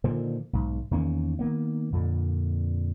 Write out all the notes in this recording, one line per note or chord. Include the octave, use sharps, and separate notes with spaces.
A#2 D3 D#3 F3
B1 G#2
E2 D#3 A#3 C#4
D#3 A#3 B3
F2 A#2 D3